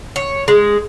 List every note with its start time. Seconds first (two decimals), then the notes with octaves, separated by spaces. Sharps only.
0.16 C#5
0.48 G#3